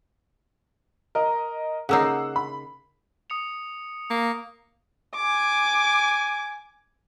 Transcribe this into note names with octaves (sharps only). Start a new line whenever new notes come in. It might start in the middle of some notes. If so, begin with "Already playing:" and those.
A#4 D#5
C#3 A#3 D#4 F#5 E6 C7
B5
D#6 C#7 F7
A#3
G#5 D6